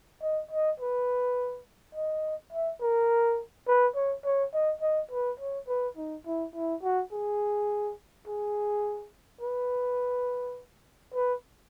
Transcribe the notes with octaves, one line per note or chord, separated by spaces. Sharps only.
D#5
D#5
B4
D#5
E5
A#4
B4
C#5
C#5
D#5
D#5
B4
C#5
B4
D#4
E4
E4
F#4
G#4
G#4
B4
B4